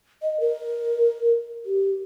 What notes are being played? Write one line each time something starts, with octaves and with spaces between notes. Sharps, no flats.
D#5
A#4
G4